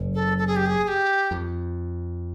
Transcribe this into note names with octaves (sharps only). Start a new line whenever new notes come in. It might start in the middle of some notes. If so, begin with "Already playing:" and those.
Already playing: F#1 F#2
A4
A4
G#4
G4
G#4
G#4
G4
F2